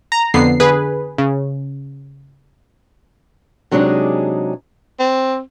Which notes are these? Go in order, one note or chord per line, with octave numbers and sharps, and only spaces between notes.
A#5
F2 D3 B3 C7
D3 G#4 B4
C#3
C3 F#3 G#3 D4 D#4 G#4
C4